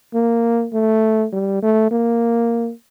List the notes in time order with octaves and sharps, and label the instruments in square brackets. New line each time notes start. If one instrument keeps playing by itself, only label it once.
[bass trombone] A#3
A3
G3
A3
A#3